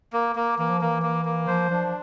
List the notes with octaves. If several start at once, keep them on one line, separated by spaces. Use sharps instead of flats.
A#3
A#3
E3 A#3
F3
E3 A#3
A#3
A#3
F3 C5
F3 D4